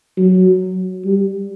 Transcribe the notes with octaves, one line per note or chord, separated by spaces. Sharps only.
F#3
G3